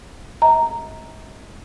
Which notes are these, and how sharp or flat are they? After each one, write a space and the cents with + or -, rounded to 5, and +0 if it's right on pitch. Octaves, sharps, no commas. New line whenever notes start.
D#5 +45 A#5 +0